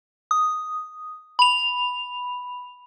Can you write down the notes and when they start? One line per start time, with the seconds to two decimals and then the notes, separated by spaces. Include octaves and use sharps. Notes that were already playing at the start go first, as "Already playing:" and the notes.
0.31 D#6
1.39 B5 F7